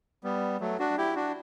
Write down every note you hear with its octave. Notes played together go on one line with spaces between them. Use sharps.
G3 B3
F#3 A3
D4 F#4
E4 G4
D4 F#4